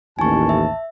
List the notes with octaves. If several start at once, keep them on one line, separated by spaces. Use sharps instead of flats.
A1 D#2 G#5 A5 C#6
E5